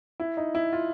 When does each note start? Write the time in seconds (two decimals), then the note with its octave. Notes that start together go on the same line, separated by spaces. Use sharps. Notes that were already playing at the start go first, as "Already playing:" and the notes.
0.20 E4
0.37 D#4
0.55 E4
0.73 F4